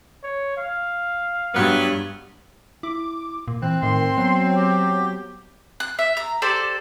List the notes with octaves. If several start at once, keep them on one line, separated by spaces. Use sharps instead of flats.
C#5
F5
G2 F#3 B3
E4 D6
A#2
E3 C4 F#6
A2 D#3 C6
F#3 B3
G4
F#6
E5
A#5
G4 A4 C5 D5